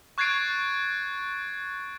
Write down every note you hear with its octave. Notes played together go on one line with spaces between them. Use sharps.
C#6 F#6 G#6 A6 C7 D7